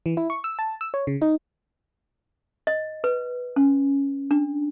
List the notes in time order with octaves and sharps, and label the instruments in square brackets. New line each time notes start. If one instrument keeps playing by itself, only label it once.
[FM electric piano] E3
E4
C#6
E6
A5
E6
C#5
C#3
D#4
[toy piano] D#5
B4
C#4
D4